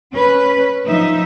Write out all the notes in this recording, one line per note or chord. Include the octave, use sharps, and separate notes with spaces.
C#4 B4
F3 D#4 E5